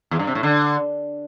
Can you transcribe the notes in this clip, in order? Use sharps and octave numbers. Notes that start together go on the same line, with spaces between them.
E2
G2
C3
A2
D3